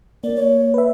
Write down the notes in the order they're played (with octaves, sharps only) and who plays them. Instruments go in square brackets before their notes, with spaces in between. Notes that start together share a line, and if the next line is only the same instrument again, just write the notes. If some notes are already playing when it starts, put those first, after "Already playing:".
[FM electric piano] A#3 [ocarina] D5
[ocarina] C#5
[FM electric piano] B4 E5